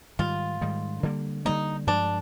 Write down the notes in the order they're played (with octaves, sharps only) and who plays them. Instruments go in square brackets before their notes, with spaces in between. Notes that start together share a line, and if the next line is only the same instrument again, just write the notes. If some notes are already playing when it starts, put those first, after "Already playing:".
[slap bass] G#2 D#3 G3 [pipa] F4
[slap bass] G#2 D#3 G3
D3 G3 A#3
[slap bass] D3 G3 A#3 [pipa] D#4
[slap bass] G2 F3 G#3 [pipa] D4